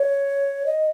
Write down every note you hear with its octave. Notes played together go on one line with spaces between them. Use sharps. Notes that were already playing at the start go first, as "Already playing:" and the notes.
Already playing: C#5
D#5